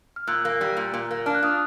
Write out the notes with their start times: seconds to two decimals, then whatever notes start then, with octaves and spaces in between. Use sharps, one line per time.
0.16 F6
0.27 A#2 E6 F#6
0.45 A#3
0.61 G3
0.77 A#2
0.94 A#2
1.11 A#3
1.26 D4 F6
1.34 F#6
1.43 F4 D#6 F6